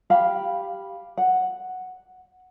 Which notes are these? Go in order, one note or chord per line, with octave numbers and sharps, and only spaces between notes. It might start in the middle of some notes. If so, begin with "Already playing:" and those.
G4 F5 B5
F#5